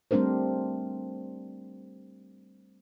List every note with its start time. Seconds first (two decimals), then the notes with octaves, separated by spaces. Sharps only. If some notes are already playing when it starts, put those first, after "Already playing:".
0.11 G3 A3 C4 D4 A#4 C5